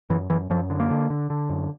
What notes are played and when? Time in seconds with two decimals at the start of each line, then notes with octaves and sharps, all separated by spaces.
0.10 F#2 E3
0.30 F#2 E3
0.50 F#2 F3
0.70 D3
0.80 A#3
0.90 D3
1.10 D3
1.30 D3
1.49 F#2